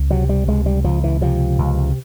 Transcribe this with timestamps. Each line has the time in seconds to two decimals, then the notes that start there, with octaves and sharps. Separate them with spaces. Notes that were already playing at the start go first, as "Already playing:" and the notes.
Already playing: C#2
0.11 C3 F#3
0.29 G3
0.47 C#2 G#3
0.66 G3
0.84 C#2 F3
1.04 E3
1.21 C3 F3
1.59 C#2